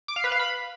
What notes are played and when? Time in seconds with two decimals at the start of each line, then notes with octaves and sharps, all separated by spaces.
0.08 D6
0.16 F5
0.24 B4
0.32 F5
0.39 B5